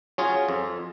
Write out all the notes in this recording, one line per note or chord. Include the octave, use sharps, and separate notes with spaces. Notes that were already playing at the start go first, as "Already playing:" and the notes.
F#3 C#4 F4 G#4
F2